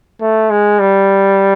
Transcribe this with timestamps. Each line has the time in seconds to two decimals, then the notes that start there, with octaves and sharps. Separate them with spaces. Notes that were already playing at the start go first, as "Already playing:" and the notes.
0.21 A3
0.50 G#3
0.80 G3